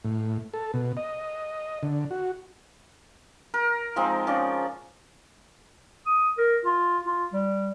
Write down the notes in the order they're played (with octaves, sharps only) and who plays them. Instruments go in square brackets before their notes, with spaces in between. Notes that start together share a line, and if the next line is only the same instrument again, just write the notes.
[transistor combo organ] A2
A4
B2
D#5
D3
F#4
[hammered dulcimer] A#4
F3 G#3 C4 D#4
F3 C#4 D5
[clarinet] D#6
A#4
F4
F4
G3